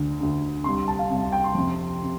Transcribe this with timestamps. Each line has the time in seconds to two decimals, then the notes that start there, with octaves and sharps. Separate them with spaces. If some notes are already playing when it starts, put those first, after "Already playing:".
Already playing: D2 D3
0.20 D2 D3
0.64 C2 C3 C6
0.88 A5
0.99 F5
1.10 C2 C3
1.32 G5
1.44 C6
1.55 F2 C3
2.04 C3